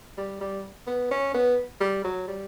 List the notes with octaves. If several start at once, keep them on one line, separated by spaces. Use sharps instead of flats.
G3
G3
B3
C#4
B3
G3
F#3
G3